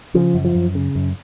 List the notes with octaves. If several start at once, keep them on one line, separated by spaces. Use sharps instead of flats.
C#3 F3
F#2
F3
F#2
C#3
F#2